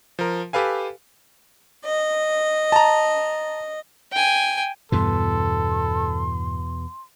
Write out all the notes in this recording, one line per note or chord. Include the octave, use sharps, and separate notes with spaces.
F3 A#4
G4 A4 B4 F5 G#5
D#5
A5 A#5
G5 G#5
E2 G2 B2 E3 A4 C6